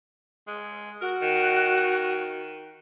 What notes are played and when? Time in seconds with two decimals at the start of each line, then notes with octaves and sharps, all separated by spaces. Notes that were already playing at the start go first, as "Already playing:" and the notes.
0.48 G#3
1.01 F#4 A#4
1.22 D#3